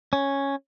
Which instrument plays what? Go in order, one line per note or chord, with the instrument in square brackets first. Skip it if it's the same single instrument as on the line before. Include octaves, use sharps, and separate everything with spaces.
[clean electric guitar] C#4